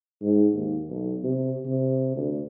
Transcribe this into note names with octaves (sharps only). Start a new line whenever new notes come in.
G#2
D#2
B1
C3
C3
D2